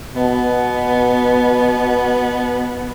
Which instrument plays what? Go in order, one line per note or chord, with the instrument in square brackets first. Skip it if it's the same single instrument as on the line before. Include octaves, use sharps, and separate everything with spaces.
[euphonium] B2 [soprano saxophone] B3